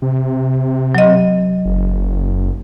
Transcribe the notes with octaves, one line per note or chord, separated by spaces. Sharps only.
C3
F#3 D#5
F#1